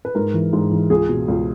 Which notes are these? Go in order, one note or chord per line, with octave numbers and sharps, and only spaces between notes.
B4
G#2 A#4
E3
G#2
E3
C#2 G#4
B2
C#2